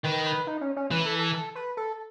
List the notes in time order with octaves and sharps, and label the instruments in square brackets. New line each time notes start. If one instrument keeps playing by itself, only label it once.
[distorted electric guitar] D#3 [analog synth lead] B4
[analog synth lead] B4
D#4
C#4
C#4
[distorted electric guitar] E3 [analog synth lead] B4
[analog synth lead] A4
A4
A4
B4
A4